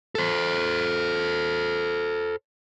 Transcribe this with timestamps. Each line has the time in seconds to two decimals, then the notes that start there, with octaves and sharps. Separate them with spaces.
0.15 A4 C5